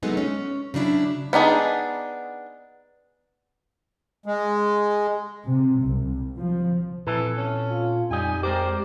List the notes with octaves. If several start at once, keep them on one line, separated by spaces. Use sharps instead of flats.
F#3 G#3 A3 B3 D#4
C#4
C#3 F#3 D4 E4
B3 D4 D#4 G#4
G#3
C3
C2
F3
A#2 E3 C4 A4
C#4
F4
F2 G3 D#4 G4 D#5 G#5
G#3 G4 A#4 C5 D5